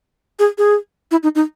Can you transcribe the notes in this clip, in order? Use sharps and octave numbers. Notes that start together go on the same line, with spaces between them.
G#4
G#4
E4
D#4
D#4